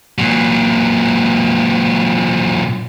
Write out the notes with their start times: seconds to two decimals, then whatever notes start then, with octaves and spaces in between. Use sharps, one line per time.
0.18 A#2 F#3